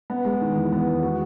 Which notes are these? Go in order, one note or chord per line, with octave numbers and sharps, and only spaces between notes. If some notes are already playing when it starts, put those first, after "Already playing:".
B3
G#3
D#3
E2
B3
G#3
F#4